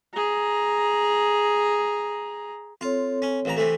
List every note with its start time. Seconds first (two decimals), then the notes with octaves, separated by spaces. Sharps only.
0.14 G#4 A#5
2.81 C4 F4 A4 C#5
3.22 C#4
3.45 A1 E3 A#5
3.57 C3 E3 A3